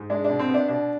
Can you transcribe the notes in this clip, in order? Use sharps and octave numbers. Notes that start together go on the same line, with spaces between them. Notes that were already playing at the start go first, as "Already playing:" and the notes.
Already playing: G#2
G#3 D4
D4
B2
C4
B3
D4
B2 D4